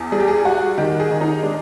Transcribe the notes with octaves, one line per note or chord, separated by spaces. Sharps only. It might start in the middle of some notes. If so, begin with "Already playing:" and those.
Already playing: E2
G3 G#4
G4
G#4
G3 F#4
D#3 G4
G#4
D#3
D#4
G#3 D4